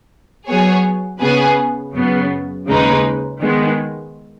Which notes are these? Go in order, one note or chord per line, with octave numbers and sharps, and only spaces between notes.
F#3 B3 G#4 C#5
C#3 B3 G#4 B4
F#2 C#3 B3
D#2 C#3 G#3 D#4 B4
D#3 G#3 B3